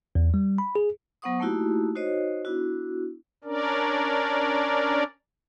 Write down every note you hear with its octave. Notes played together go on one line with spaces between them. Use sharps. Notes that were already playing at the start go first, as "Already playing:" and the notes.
E2
G3
B5
G#4
F#3 B3 C5 F#5 C#6 D#6
A3 A#3 D#4 E4 F#4 G4
D#4 F#4 C5 C#5 D#5
B3 D4 E4 F#4
C#4 D4 A#4 D5